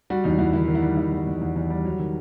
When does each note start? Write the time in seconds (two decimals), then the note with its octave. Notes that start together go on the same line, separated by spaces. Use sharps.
0.10 G3 F#4
0.24 E2 D#4
0.38 E2 E4
0.53 D#3 E4
0.68 D#3
0.75 E4
0.82 G3
0.97 E2 E4
1.12 E2
1.27 E2
1.41 E2
1.56 E2
1.70 G3
1.85 F#3
1.99 D#3